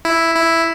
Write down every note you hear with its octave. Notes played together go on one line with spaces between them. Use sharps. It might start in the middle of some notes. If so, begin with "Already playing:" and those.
E4
E4